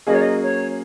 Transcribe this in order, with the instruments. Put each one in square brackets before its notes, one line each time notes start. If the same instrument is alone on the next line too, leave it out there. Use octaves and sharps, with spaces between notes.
[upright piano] F#3 A#3 C#4 G#4 [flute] D#5
[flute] C#5
D#5
C#5